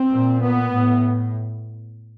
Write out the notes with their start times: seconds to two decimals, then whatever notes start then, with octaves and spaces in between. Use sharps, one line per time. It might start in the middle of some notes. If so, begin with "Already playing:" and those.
Already playing: C4
0.10 A#2
0.41 B3
0.72 A2